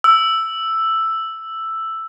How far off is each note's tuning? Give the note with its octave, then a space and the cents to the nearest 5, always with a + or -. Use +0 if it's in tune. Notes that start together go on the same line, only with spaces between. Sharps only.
E6 +5